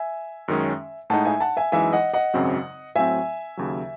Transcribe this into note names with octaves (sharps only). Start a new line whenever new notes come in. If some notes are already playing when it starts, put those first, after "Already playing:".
Already playing: E5 G#5
F#2 D#3 G#3 C#4
A2 G#3 D#4 F#5 A5
E5 G#5
F#5 A5
E5 G#5
F#2 E3 G#3 D#4 E5 G#5
D#5 F#5
D#5 F#5
G#1 F#2 C#3 F#3 C4
A2 F#3 C4 E5 G#5
D#2 C#3 F#3